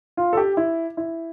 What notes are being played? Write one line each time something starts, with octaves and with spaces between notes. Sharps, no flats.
F4
A4
G4
E4
E4